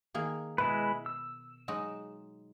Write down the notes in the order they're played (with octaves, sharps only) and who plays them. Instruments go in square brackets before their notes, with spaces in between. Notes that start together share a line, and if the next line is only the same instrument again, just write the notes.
[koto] D#3 A#3 G#4
[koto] B2 [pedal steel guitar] G#3 E4 B4
[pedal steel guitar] E6
[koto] F#3 G#3 D#4